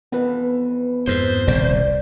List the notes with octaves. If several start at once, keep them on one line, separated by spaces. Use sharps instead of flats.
F2 E3 B3 B4
F2 G#2 C5
D#1 C2 C#3 D5